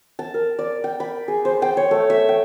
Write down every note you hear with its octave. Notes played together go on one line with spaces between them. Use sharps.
A5
A#4
D5
G5
B5
G#4
C5
G5
C#5
A3
E5
G5